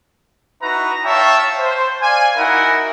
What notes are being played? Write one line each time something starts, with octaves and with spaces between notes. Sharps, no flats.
D#4 E4 F#4 B4 A#5
C#5 E5 F5 G5 A5
C5
D5 F5 G#5
D#4 E4 F#4 A#4 F#5